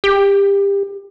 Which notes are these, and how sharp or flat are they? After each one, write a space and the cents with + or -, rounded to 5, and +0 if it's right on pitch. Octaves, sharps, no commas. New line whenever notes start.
G4 +25